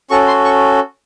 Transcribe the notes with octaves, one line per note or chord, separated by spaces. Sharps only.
C#4 F#4 A4 C#6
C6
C#6